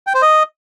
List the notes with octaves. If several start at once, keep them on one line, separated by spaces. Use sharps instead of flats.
G5
C5
D#5